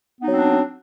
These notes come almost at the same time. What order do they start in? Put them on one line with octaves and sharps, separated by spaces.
B3 D#4 F#3 C4 D4